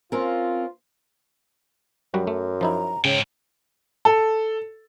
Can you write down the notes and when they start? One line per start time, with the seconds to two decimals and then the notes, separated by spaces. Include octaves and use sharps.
0.12 C4 C#4 F4 A#4
2.14 F#2 F#3 G3 F#4
2.27 A3
2.61 F3 D#4 E4 A#5
3.05 G#2 C#3 C#5 G5
4.05 A4